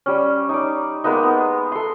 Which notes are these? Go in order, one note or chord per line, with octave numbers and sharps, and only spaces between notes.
G3 C#4
D#4 D5
G#3 A#3 B3 D#4
B3
A4 C6